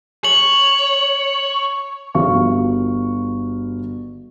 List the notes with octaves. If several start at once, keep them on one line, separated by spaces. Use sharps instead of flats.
C#5 F#7
G1 F4 F#4 F5 C#6